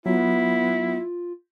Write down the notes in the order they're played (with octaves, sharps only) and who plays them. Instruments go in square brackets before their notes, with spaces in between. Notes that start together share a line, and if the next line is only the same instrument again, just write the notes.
[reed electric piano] F#3 [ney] B3 [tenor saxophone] E4 [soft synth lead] F4